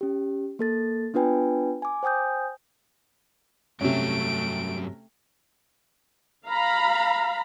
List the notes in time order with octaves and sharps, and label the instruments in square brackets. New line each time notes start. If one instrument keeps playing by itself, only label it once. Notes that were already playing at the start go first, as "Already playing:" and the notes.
[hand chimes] C#4 G4
A#3 A4 A6
B3 D4 F4 B4 G5 G#5
G#5 D6
C5 G5 G#5 D#6 G6
[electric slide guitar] G2 F#3 [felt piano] C3 C#4 [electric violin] A3 D7
[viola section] F5 A#5 B5